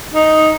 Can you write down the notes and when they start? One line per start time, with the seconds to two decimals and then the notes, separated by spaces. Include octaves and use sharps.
0.14 D#4